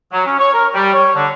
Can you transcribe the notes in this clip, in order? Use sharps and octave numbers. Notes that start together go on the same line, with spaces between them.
F#3
C#4
C#5
A#4
G3
C#5
D3